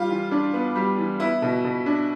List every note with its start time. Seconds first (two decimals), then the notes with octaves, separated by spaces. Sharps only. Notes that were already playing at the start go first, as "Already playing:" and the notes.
Already playing: G3 F4
0.09 E3
0.31 D4
0.54 B3
0.76 G3
0.98 E3
1.20 B3 E4
1.42 B2
1.65 B2
1.86 D4